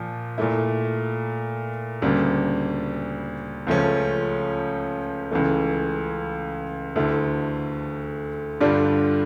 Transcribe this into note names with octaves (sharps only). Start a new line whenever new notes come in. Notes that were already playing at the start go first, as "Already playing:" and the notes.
Already playing: A#2 F3
A#2 A3 E4
D2 C#3 G3 A#3
C#2 C#3 F3 A3 C#4
C#2 C#3 E3 A3
D2 D3 A3 E4
G2 D3 G3 D4 F4